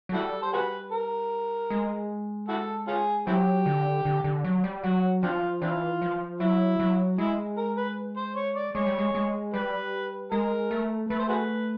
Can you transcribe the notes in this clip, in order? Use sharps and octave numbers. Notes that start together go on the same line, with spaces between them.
F#3
G3 E4 F#4 A4
C5
F#4 G#4 B4
A#4
G#3
E4 F#4 A4
C#4 F4 G#4
F#3 C4 E4 G4
D3
D3
D3
F#3
G3
F#3 F#4
F3 C4 D4 F4
E3 C4 D4 F4
F3
F#3 E4
F#3
G#3 E4
A#4
B4
C5
C#5
D5
G#3 C#5
G3
G#3
G#3
G3 B4
G#3 A#4
A3
A3 B4
C5
F#4 G#4 B4